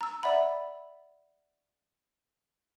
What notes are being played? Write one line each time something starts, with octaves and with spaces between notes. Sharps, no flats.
A#5 E6
D5 E5 F#5 B5